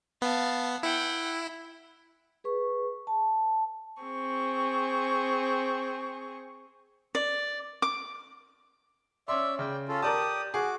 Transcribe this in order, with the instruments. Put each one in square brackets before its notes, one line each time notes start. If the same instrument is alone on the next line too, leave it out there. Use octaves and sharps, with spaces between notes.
[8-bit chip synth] B3 [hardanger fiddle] F5 A5
[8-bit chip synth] E4 [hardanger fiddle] F#5 G5
[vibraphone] G#4 B4 C#6
A5
[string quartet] C4 G#4 C#6
[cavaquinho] D5
D6
[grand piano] C#4 C6 [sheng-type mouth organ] D5 E5
[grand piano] C#3 [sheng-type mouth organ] D5 G5
[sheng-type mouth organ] C#4 F4 A4
[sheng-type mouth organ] G4 D#6 [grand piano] A#4 D5 A5
[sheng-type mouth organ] F#4 D6 [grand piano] G#4